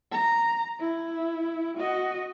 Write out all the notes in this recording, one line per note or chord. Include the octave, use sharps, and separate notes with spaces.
A#5
E4
F#4 D#5